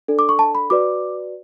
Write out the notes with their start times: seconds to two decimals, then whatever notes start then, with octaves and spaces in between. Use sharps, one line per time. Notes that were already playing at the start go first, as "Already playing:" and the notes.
0.08 D4 A4 D5
0.19 D6
0.29 C#6
0.39 A5
0.55 B5
0.70 F#4 B4 D5 D6